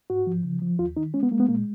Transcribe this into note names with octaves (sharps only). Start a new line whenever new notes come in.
G#2 F#4
F3
C#3
F3
D#2 F4
D#3 D#4
G#3 C#4
B3
G#3 A#3
B3
A#2 A#3